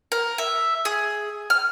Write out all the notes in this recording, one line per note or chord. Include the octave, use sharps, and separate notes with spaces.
A#4
E5
G#4
F6